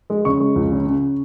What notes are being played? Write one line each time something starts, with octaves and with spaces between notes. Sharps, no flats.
G#3
C#3 C#6
G#3
C#2
C#3
C#3